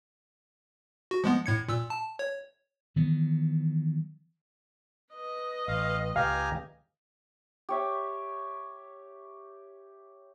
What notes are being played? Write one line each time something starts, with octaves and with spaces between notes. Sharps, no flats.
F#4
F3 G#3 B3
A2 G#6 C#7
A#2 E6
A5
C#5
D#3 E3 F#3 B3
B4 D#5
A1 F5
C#2 G4 F5 G#5 A#5
G4 C#5 E5